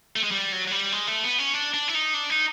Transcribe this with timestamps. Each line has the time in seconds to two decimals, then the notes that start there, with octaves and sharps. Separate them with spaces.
0.16 A3
0.24 G#3
0.31 G3
0.52 F#3
0.68 F#3
0.71 G3
0.92 G#3
1.08 A3
1.24 B3
1.38 C#4
1.54 D4
1.74 D4
1.88 E4
1.95 D#4
2.14 D4
2.30 D#4